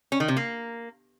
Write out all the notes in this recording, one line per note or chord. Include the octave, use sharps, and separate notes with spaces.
C#4
D#3
C3
A#3